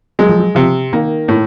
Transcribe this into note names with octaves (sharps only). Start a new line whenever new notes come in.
F#3 G#3
F3
F#3
C3 F3
D#3 A#3
A2